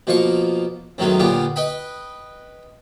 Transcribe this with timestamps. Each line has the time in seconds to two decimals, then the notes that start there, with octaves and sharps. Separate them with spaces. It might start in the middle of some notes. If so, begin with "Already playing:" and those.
0.07 B2 F3 A#3 F4 C#6
0.98 F#2 A2 D#3 F#3 G#3 B3
1.19 A#2 D3 B3 F4 G4
1.56 B4 D#5 G5 B5